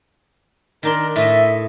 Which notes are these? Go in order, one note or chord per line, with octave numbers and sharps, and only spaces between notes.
D#3 D4 A#4 C6
A2 A3 D#5 E5